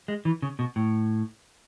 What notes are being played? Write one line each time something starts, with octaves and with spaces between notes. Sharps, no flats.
G#3
E3
C#3
B2
A2